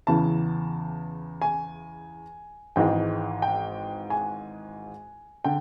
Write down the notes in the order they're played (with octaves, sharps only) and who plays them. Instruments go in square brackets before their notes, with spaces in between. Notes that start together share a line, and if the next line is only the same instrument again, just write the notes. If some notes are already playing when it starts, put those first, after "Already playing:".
[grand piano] E2 C#3 E3 A5
G#5
G#1 G#2 E3 G#3 G5
G5
G#5
D3 G5